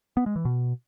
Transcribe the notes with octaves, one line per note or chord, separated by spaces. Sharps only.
B3
G#3
E3
B2